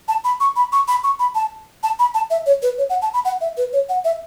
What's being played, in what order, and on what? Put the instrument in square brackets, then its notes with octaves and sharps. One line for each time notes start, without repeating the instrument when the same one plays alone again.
[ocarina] A5
B5
C#6
B5
C#6
B5
C#6
B5
A5
A5
B5
A5
E5
C#5
B4
C#5
F#5
A5
B5
F#5
E5
B4
C#5
F#5
E5